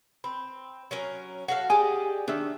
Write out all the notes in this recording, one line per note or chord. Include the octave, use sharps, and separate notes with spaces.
C4 B5
F#3 C#4 A#4
F#4 A4 F5 F#5
G4 G#4 D5 D#5 G#5 D#6
D#3 D4 E5